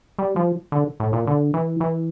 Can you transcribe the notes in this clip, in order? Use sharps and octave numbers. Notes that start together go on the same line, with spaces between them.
G3
F3
D3
A2
A#2
D3
E3
E3